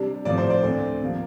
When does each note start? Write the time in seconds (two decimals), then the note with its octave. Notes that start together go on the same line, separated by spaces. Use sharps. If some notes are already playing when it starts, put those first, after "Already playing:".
Already playing: C3 G3 D4
0.25 A2 F3 C4 D5
0.38 C5
0.50 D5
0.63 D2 D3 A3 C4
1.01 C3 F3 A#3